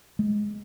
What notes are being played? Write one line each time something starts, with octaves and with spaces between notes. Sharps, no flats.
G#3